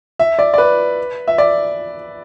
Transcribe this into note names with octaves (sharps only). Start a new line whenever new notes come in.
E5
D5
D5
B4
E5
D5